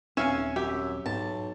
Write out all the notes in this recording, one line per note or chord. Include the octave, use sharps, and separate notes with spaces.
D#1 B1 C4 C#4 E5 F5 G#5
F#2 G4 E5
B1 G#2 A5